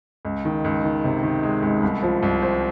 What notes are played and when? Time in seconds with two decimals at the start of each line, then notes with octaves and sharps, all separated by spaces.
0.25 C#2
0.45 D#3
0.64 C#2
0.84 D#3
1.04 C3
1.23 D#3
1.43 G#3
1.62 C#2
1.83 C2
2.02 F3
2.23 C2
2.42 C4